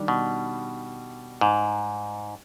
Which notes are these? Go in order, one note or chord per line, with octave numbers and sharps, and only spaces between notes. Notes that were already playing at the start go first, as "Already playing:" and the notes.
Already playing: D#3 G3 D4 G4
B2
G#2